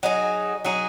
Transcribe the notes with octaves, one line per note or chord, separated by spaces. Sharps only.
F#3 D#4 G#4
F#3 D#4 G#4